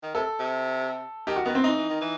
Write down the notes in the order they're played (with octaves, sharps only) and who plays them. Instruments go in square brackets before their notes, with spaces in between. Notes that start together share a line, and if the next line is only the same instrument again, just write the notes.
[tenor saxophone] D#3
[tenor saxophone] C3 [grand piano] A4
[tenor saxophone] C3
[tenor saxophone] D#3 [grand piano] G4
[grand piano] F#4
[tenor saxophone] D#3 [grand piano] B3
[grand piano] C4
[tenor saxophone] E3 [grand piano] D#4
[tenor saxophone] E3
D#3
E3